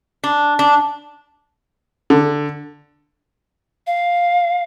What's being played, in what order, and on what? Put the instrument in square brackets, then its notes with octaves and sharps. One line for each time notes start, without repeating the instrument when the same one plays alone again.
[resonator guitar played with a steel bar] D4
D4
[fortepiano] D3
[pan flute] F5